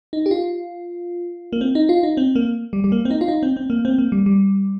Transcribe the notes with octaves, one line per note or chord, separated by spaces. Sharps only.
D#4
G4
F4
A#3
C4
D#4
F4
D#4
C4
A#3
G3
G3
A#3
C4
D#4
F4
D#4
C4
C4
A#3
C4
A#3
G3
G3